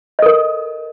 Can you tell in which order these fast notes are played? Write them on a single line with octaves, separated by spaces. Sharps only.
D#5 A4 A#4